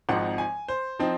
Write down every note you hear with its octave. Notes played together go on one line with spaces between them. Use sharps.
G#1 G#2 F3 C4 D#4 F#5
G#5
C5
F3 C4 D#4